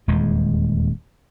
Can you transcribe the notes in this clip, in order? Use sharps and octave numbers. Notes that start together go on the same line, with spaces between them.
D#1 E2 G#3